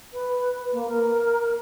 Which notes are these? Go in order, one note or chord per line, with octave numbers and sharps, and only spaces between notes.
B4
A#3
A#4